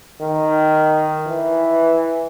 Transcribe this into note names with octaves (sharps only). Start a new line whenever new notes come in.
D#3
E3